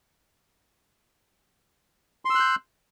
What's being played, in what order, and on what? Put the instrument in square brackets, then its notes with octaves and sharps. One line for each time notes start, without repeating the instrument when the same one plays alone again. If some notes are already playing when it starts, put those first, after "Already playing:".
[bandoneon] C6
E6
F#6
G6